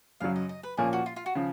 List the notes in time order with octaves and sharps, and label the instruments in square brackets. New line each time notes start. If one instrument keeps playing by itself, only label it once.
[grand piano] F#2 C#3 F#3 [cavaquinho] F5
[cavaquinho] D#5
D#5
B4
[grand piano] A#2 F3 A#3 C#4 [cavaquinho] G#4
[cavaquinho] F#4
F4
F4
F#4
[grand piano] C#3 F3